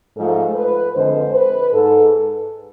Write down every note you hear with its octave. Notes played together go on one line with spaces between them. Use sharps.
G#2 F3 A3 A4
B4
F2 D3 G#3 C5
B4
G#2 A4